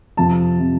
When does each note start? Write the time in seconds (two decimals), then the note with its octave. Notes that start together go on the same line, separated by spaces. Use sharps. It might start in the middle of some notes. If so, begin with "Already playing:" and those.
0.17 F2 C3 F3 A5
0.59 C3 F3